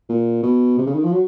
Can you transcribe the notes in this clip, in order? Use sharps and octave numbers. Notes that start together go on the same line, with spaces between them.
A#2
B2
C3
C#3
D#3
F3
F#3